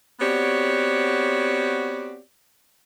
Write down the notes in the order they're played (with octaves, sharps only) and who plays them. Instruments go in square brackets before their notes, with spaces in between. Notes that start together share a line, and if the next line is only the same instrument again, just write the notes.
[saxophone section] B3 C4 F#4 G4 C#5 D5